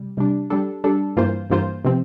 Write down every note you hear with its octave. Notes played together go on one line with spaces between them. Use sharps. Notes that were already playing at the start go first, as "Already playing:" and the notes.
Already playing: C3 G3
C3 G3 D4
G3 D4 A4
G3 D4 A4
G2 E3 A#3 F4 C5
G2 E3 A#3 F4 C5
C3 F3 C4